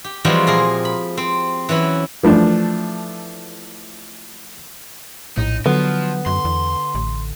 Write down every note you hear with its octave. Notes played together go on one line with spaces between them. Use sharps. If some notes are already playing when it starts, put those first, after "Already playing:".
G4
E3 F3 G3 G#3 C4 F#4
A#2 G#4 A#4 F5
B5
C4
E3 F#3 C#4 E4
E3 F3 A3 D4
A#1 A2 D#4
D3 F3 F#3 B3
F#2 C6
E2
A1